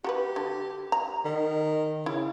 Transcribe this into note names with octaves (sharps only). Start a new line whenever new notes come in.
F#4 G4 A4 B4
D3
A#5
D#3
C#3 E4